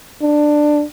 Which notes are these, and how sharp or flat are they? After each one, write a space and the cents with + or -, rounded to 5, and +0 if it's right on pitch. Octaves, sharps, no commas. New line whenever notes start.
D4 +15